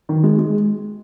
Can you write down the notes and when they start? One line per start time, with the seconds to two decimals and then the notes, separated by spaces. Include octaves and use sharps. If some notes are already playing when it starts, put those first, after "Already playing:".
0.09 D#3
0.23 G#3
0.38 G#3